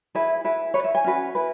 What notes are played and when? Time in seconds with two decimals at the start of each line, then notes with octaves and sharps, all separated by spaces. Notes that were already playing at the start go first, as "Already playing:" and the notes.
0.15 E4 G#4 B4 E5
0.44 E4 G#4 B4
0.74 E4 B4 C#5
0.84 E5
0.95 G#5
1.04 C#4 F#4 B4
1.35 E4 B4